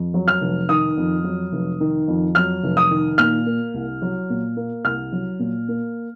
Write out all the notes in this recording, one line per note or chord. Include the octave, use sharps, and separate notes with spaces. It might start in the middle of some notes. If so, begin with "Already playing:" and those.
Already playing: F2
F#3
F6
F1
D#3 D#6
F2
F#3
F1
D#3
F2
F#3 F6
F1
D#6
D#3
A#2 F6
A#3
C2
F#3
A#2
A#3
C2 F6
F#3
A#2
A#3